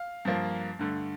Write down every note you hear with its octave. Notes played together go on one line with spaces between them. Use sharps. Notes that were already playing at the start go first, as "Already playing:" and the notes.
Already playing: F5
G2 F3 A#3
G2 D3 A3